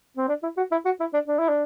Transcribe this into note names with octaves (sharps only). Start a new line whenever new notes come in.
C4
D4
E4
F#4
E4
F#4
E4
D4
D4
E4
D4